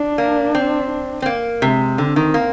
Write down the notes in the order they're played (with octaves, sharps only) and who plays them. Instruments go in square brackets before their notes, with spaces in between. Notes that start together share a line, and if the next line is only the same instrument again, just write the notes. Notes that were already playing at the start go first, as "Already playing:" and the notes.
Already playing: [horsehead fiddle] D4
[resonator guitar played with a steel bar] A#3
C4
[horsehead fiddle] D4
[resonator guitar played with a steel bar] C4
A#3
[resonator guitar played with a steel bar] C3 [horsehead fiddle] G#3
[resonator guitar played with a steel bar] D3 [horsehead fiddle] C4
[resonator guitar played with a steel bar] D#3
A#3